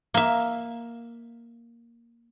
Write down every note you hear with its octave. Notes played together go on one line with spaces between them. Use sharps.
A#3 E5